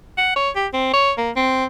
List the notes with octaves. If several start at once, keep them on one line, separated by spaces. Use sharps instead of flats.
F#5
C#5
G4
C4
C#5
A#3
C4